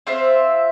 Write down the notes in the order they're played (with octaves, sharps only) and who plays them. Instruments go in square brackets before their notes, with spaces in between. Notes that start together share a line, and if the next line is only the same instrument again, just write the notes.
[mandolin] C4 F4 C5 E5